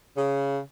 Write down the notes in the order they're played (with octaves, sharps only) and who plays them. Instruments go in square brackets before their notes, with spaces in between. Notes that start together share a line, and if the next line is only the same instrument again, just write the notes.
[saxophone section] C#3